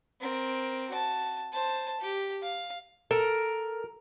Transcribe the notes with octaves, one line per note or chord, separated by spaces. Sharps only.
C4 A#4
F#4 A5
C5 A5
G4
F5
A4 A#4